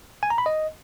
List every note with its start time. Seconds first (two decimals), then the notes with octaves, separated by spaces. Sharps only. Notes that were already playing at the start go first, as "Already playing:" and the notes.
0.23 G#5
0.30 A#5
0.38 B5
0.46 D#5